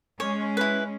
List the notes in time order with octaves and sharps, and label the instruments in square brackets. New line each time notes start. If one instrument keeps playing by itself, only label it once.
[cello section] G#3 C#4 [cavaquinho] C#5
[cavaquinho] E4 B4